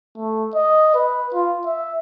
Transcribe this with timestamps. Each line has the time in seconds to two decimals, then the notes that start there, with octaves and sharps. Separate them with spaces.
0.18 A3
0.55 D#5
0.95 B4
1.33 F4
1.66 E5